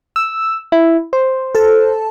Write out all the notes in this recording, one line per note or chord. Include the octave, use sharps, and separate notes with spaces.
E6
E4
C5
A4 A5